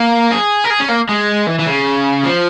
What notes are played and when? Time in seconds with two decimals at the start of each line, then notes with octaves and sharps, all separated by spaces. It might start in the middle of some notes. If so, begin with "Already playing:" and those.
Already playing: A#3
0.32 G#4
0.65 A#4
0.70 G#4
0.80 C#4
0.89 A#3
1.09 G#3
1.47 E3
1.59 E3
1.66 C#3
2.23 F3